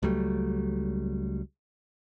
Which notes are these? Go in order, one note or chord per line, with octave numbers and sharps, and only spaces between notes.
C#2 F#3 G3 A3